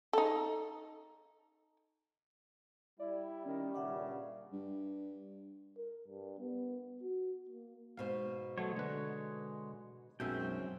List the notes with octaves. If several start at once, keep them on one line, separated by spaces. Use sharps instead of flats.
D#4 A4
G3 E4 D5
D#3 C#4
G2 A#2 C#3 E5 F#5 D6
G2
A#4
G2
B3
F#4
A#3
G#2 B2 C5 F5
F#3 G#3 A3 B3 C#5
D3 B4
B1 F#2 F#3 G#3 C4 C#4 E5 G5